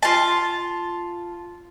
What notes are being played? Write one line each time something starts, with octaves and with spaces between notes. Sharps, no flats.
F4 A5